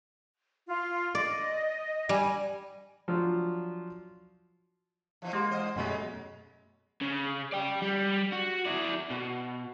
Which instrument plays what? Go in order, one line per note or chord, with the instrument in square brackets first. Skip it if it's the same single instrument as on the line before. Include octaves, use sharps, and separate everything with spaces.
[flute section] F4
[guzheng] D5 [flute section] D#5
[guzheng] G3 [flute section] G#5
[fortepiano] F3 F#3 D4 F4
[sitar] B2 E3 F3
[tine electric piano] G#3 [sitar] A#3 [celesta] G4 F#5 C6
[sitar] E2 C5 D#5
[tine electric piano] F#2 B2 A3 [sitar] F#3 G#3 B3
[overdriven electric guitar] C#3
D5 G5
G3
F#4
E4 D5
B2